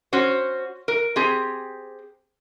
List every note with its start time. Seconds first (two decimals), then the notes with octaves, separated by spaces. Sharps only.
0.13 C#4 F#4 C5
0.88 A#4
1.16 C4 G4 G#4